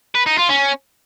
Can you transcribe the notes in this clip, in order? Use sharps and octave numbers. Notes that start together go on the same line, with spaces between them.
B4
D#4
F4
C#4